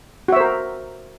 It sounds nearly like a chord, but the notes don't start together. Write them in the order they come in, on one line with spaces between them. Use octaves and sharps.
F#4 E5 C5 A#4